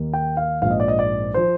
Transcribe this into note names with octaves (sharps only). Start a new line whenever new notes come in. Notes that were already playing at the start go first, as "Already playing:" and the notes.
Already playing: D#2 D#3 A#3
G5
F5
A#1 G#2 F3 F5
D#5
D5
D#5
D5
F3 C5